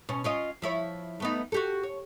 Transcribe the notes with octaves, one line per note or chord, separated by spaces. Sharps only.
B2 C#4
C#4 F4 D#5
F3 E4 C#5
A3 B3 D#4
F#4 G4 A4
C#5